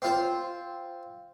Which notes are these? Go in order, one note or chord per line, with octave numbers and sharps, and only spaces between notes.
C4 F4 C5